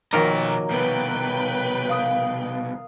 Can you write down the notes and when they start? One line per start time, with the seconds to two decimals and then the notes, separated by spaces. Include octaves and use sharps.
0.12 B2 D#3 F3 F#3 A#3 A#4 A#5
0.71 C2 B2 B4 G5
1.89 F5 D#6